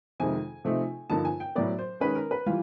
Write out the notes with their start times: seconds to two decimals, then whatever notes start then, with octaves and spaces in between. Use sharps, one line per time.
0.20 F2 C3 D#3 G#3 G#5
0.65 C3 F3 A3 C4 D#4
1.09 G2 D3 F3 A#3 D#4 A5
1.25 G#5
1.40 G5
1.55 A2 F#3 B3 D5
1.78 C5
2.00 D#3 G#3 C#4 B4
2.15 A#4
2.31 B4
2.46 E3 G3 F4